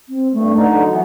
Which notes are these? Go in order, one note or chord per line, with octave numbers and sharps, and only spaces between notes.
C4
G2 A3
D3 D#4 D5
F#3
E3 B3